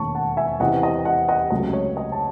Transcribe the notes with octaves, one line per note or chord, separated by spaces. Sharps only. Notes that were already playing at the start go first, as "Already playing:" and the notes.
Already playing: E1 D#2 D#3 A3 C#4 A5 C#6
F#5 A5
E5 G#5
E2 C3 E3 D#5 F#5
D#5
D#5 F#5
D#5 F#5
C#2 C3 F#3 A3 D#5
C#5
D#5
A5